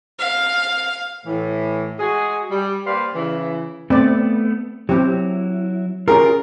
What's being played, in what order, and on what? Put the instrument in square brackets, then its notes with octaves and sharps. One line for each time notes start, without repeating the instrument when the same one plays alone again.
[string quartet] F5
[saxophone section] A2 E3
G#3 F#4 G#4
G3
A#3 G4 B4 C5 D5 F5
C#3 E3
[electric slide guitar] A3 B3 [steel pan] C4 D5
[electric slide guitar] F#3 E4 [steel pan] C4 G4
[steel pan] C#4 G#4 [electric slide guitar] F4 G4 [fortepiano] A#4